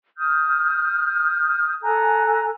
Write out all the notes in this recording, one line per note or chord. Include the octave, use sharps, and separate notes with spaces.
D#6 F6 G6
A4 G#5 A#5 F#6